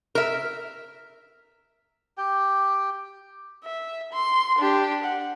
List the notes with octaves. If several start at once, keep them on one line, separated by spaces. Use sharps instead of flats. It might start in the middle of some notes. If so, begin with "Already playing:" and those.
A#4 E5
G4 G5
E5
C6
D4 G4
F#5